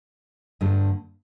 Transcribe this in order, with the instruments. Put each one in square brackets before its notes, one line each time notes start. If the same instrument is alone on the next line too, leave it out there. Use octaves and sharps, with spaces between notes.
[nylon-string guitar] G2 D3 A3